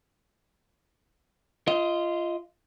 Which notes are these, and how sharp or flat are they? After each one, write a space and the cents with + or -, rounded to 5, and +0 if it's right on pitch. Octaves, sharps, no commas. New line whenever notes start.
F4 -15 D#5 +15